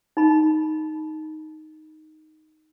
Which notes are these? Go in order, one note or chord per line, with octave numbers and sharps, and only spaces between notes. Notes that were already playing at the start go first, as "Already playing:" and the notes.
D#4 B5